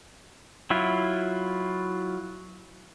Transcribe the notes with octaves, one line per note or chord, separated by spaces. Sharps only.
F#3 E4 F4